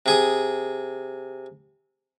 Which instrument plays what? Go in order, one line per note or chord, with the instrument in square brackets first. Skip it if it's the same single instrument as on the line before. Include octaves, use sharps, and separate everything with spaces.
[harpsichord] C3 G#4 D#6